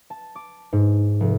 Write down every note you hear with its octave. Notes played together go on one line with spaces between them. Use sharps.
A5
D6
G#2
F1